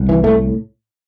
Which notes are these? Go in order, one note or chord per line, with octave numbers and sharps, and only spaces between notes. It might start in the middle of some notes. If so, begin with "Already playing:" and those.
Already playing: C2
E3
A2 A3